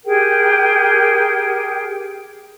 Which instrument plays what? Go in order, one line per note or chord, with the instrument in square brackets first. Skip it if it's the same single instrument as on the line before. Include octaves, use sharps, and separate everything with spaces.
[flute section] G4 G#4 A#4 G5